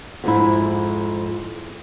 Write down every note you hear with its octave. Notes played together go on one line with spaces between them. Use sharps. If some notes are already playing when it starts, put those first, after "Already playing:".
F2 G#2 E4